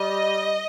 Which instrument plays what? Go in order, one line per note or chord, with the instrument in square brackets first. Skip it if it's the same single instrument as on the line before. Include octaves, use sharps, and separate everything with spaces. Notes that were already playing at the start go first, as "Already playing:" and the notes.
Already playing: [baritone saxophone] G3 [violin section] D#5